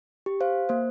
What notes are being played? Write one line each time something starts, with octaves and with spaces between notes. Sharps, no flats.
G4
C5 F5
A#3 C5